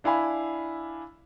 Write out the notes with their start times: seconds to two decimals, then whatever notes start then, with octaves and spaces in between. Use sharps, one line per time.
0.04 D4 E4 F5 G#5 B5